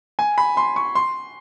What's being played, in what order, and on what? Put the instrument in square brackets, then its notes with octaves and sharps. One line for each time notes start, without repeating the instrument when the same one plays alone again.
[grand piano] G#5
B5
C6
C#6
C6